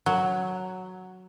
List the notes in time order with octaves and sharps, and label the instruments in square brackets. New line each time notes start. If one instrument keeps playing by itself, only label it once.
[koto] F#3